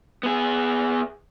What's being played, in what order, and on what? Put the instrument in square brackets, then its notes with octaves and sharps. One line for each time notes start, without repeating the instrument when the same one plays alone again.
[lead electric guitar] B3 G#4